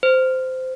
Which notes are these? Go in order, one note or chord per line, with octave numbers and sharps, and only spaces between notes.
C5